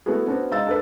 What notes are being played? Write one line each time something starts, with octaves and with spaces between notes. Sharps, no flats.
A3 B3 E4 F#4 G#4
B3 C#4 D4 F#4 C5
G#3 D#4 D#5 F5 E6 A6
D4 A4 B4